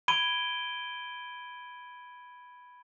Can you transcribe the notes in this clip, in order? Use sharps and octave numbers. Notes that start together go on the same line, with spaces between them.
B5 G#6 D7 D#7 G7